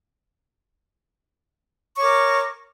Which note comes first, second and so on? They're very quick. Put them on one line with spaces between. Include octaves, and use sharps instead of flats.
C#6 C#5 D6 A#4